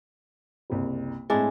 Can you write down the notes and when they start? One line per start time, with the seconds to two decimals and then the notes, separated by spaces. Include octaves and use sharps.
0.70 F#1 C2
1.30 A2 G#3 C4 D4 E4